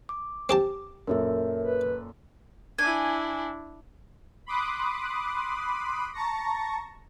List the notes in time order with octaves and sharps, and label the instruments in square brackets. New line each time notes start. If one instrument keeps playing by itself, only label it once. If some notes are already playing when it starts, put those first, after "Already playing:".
[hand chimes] D6
[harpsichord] C4 G4 A5
[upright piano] F#2 A#2 A4 [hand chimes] A#4 C#5 E5
[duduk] B4
[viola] D4 E4 [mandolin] G#5
[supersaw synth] B5 C6 D6 D#6 F#6
A5 A#5 C#6 A#6